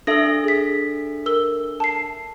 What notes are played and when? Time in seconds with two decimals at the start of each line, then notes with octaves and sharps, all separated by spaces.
0.07 D4 A4 E5 E6 A#6
0.44 G#4 B6
1.26 A#4 E6 G7
1.80 A5 C7